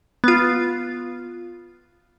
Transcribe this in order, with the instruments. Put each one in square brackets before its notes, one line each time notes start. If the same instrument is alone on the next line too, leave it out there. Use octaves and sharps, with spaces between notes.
[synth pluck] B3 F4